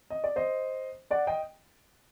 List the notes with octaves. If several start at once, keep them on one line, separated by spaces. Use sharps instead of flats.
D#5
D5
C5 D#5
D5 F#5
D#5 G5